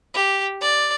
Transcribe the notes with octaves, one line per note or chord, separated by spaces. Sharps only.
G4
D5